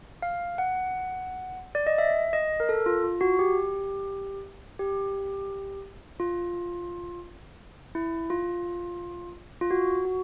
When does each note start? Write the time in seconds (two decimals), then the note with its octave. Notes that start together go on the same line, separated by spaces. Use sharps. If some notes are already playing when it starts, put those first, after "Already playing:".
0.22 F5
0.58 F#5
1.75 D5
1.87 D#5
1.98 E5
2.33 D#5
2.60 A#4
2.69 A4
2.86 F4
3.03 F4
3.21 F#4
3.39 G4
4.79 G4
6.20 F4
7.95 E4
8.30 F4
9.61 F4
9.71 F#4
10.05 F#4